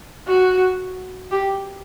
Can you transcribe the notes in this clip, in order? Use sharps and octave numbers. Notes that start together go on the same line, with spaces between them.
F#4
G4